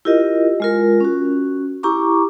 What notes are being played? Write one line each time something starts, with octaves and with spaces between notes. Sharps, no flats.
E4 F4 G4 A#4 D#5
G#3 F4 A#4
C#4 F#4
E4 G4 A#5 C#6 D6